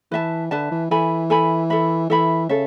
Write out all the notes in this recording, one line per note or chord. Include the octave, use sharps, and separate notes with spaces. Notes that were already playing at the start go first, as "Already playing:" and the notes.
E3 B4 E5 A5
D3 B4 E5 A5
E3
E3 A4 E5 G#5 B5
A4 E5 G#5 B5
A4 E5 B5
E3 A4 E5 B5
C#3 A4 E5